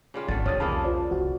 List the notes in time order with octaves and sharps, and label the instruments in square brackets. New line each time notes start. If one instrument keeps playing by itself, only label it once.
[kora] C#3 G3 F4
[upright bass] G#1 [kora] D3 A3 [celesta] A6
[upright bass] C#2 [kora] C3 [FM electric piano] D4 D#6 [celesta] C#5 F6 A6
[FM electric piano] B1 E2 A5 [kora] C#3 F3 A#3 [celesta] B5
[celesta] F4 C5 D5
[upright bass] C2 [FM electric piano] F#4